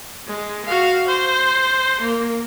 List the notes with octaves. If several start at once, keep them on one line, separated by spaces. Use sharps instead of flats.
G#3
F#4 F5
C5
A#3